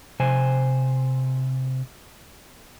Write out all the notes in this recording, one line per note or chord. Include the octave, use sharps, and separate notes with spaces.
C3 C5 G#5